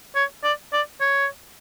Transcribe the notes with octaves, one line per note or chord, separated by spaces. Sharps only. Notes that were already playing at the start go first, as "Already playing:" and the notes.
C#5
D5
D5
C#5